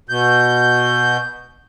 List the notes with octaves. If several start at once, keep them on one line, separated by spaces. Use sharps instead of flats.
B2 G6